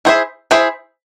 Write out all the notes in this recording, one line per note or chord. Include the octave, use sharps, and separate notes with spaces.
E4 G#4 C5 E5
E4 G#4 C5 E5